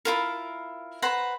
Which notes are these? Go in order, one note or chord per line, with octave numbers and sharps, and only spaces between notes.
E4 F4 A#4
B4 C5 F#5 A#5